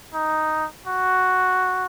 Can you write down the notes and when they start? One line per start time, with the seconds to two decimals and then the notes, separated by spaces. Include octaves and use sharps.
0.14 D#4
0.87 F#4